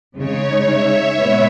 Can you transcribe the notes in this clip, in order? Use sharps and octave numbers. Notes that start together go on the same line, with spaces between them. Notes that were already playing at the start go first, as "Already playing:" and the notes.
C#3 G#3 D#4 C#5
E5
A#2 G#3 B3 E4